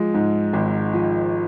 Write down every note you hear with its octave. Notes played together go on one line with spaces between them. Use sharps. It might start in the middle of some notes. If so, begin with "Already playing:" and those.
Already playing: F3 G#3
G#2
G#1
F3